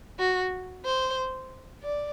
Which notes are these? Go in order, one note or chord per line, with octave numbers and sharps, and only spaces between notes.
F#4
C5
D5